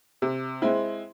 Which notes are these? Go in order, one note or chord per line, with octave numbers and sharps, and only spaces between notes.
C3
G#3 C4 E4